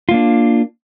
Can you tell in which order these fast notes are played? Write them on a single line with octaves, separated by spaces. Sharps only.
F4 A#3 D4